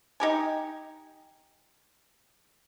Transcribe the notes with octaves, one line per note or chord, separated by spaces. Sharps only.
D#4 G4 G#5